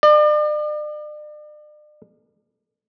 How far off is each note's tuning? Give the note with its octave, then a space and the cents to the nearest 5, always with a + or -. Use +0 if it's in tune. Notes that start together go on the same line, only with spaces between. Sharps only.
D5 +40